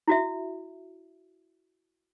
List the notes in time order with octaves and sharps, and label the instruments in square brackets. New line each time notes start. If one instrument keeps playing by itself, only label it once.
[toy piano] E4 F#4 E5